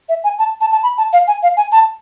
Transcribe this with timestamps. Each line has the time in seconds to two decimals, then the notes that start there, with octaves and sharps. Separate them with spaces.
0.09 E5
0.24 G#5
0.39 A5
0.61 A5
0.72 A5
0.83 B5
0.98 A5
1.13 F5
1.27 G#5
1.43 F5
1.57 G#5
1.72 A5